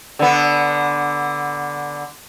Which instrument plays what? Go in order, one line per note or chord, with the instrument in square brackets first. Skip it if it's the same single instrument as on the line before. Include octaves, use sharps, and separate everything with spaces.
[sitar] D3 B3